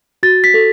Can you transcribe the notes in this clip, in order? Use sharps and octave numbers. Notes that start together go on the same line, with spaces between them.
F#4 A6
B6
A4